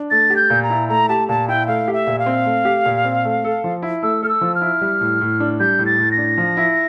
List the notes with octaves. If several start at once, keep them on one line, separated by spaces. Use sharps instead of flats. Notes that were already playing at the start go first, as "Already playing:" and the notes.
Already playing: D4
A3 A6
G4
G6
A#2
A#5
E4
A3 A#5
G4 A5
A#2 A5
E4 G5
A3 F5
G4
E5
A#2
F5
C4
A3
G4
A#2
C4
A3
A4
F3
E4
A3 E6
A4 F6
E6
F3
F6
E4
G3
A2
A2
D4
G3 G6
A2
A6
A2
A#6
D4
F3
E4